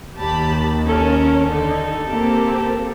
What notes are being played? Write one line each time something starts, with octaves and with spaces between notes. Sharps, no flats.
D#2 G4 A5 B5
C#4 A4 A#4
D3 D#4
A#3 C4 G4